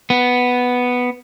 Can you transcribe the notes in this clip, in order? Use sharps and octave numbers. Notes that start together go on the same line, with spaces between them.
B3